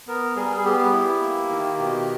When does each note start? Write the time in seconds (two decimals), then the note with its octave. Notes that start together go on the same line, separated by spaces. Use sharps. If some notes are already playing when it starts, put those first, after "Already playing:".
0.07 B3 A#4
0.36 G3 G#4
0.58 G#4
0.65 B3 G4
0.93 E4
1.21 A#3
1.50 D#3
1.78 B2